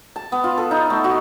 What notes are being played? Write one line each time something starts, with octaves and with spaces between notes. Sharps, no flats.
A5
B3
F4
A4
D#4
A3
F#4